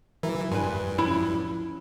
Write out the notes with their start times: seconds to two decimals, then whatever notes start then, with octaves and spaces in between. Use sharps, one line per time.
0.23 E3 F#3 E4 A#4
0.52 G2 B4 G#5 C6
0.98 F3 C#4 E4